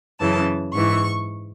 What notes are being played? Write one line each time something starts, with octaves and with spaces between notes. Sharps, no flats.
F#2 C#3 E3 A5
G#2 E3 C#6